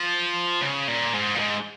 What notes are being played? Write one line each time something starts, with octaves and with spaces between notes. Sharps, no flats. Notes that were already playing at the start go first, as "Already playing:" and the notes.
Already playing: F3
C#3
A#2
G#2
A#2
G#2